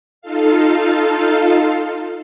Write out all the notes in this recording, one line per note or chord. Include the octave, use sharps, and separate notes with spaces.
D#4 F4 A4 F5